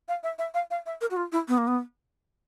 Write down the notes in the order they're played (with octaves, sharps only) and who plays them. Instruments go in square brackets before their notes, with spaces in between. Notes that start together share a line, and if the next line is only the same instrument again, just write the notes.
[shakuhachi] F5
E5
E5
F5
F5
E5
A#4
F#4
F4
E4
B3
A#3
B3